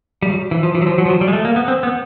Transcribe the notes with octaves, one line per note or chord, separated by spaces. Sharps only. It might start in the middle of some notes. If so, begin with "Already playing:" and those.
G3
F#3
E3
F3
E3
F#3
F3
F#3
F3
F#3
G3
G#3
A3
A#3
B3
C4
B3